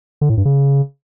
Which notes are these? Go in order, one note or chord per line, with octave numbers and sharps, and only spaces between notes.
D3
A2
G2
C#3